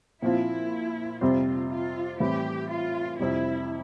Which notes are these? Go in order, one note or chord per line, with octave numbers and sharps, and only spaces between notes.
A#2 F3 C4 E4 F4
F2 C3 G3 C4 F4
F4
A2 E3 G3 C4 G4
F4
F2 C3 G3 C4 E4